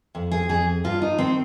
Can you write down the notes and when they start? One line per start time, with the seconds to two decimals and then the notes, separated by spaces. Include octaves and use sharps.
0.15 F2
0.31 G#4
0.49 F2 G#4
0.84 G2 F4
1.02 D#4
1.18 D#3 C4